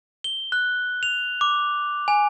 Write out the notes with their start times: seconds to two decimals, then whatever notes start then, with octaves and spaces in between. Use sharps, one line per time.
0.24 G7
0.52 F#6
1.03 F7
1.41 D6
2.08 G#5